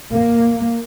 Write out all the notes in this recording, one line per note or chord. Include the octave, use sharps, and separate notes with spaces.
A#3